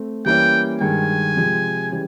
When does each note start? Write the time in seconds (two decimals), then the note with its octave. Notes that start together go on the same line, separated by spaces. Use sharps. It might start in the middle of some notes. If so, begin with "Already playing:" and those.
Already playing: A3 C4
0.25 E3 G3 A#3 C#4 E4 G5
0.81 G2 D#3 G#3 G#5
1.36 C3 F3 G#3
1.91 C#3 E3 G3